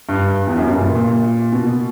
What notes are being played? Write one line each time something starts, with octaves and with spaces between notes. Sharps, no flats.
G2
E2
F#2
G2
A#2
A#2
B2